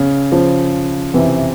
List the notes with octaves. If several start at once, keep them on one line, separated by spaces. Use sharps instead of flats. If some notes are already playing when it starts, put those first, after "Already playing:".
Already playing: C#3
C#3 F3
C3 E3